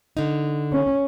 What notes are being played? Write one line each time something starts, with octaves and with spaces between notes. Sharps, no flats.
D3 D#4
C#4